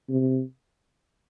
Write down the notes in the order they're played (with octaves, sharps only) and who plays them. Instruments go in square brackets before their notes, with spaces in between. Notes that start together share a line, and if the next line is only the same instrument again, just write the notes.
[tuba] C3